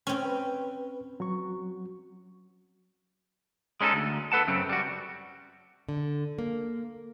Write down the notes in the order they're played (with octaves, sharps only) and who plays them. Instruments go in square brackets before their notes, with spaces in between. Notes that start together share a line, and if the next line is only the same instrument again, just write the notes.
[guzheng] C4 C#4
[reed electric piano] B4 G5
F#3 F#4 C#6
[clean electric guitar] G#3 C#4 D#4 G4 A4
D2
A4 B4 F#5 A5
F#2 C#3 C4
G3 F#4
[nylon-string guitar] D3
A#3